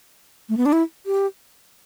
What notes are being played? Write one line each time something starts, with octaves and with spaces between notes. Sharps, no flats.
A3
B3
D4
E4
G4